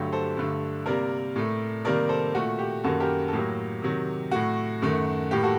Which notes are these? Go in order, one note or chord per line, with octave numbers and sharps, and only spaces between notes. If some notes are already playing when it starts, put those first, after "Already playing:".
Already playing: G2 D3 F#3 A3 G4
A4 C5
G2 D3 A3
C3 G3 A#3 A#4 D5
A2 A3
C3 D#3 G3 A#3 A#4 D5
A4 C5
A#2 A3 F#4
G4
F#2 D#3 G3 A#3 F#4 A4
G4 A#4
A4
A2 F#3 A#3 G4
C3 D#3 F#3
A2 A3 F#4
F#2 D#3 A3
A2 G3 A#3 G4
F#4 A4